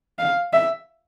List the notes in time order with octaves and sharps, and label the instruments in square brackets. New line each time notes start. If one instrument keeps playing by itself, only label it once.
[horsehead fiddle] F5
E5